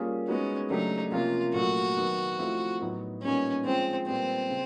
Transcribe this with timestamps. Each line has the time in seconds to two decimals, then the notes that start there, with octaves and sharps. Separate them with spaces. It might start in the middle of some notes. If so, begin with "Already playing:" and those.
Already playing: G3 A#3 C#4 F4 G#4
0.28 G#3 B3 C#4 D#4 F#4
0.70 C#3 F#3 A3 D4 D#4 G4
1.12 C3 F3 A#3 C#4 F4
1.54 A#2 F#3 A3 F#4
1.96 D#3 F#3 B3 D#4
2.39 F3 A3 C4 E4
2.81 A2 F#3 B3 D#4
3.23 A#2 G3 B3 C#4 D#4
3.65 F3 G#3 C4 C#4
4.07 A#2 G3 B3 C4
4.50 C#3